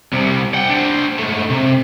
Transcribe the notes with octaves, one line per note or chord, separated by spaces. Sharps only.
C2 C3
F#5 G5
D4 C5
G#2 A3
C3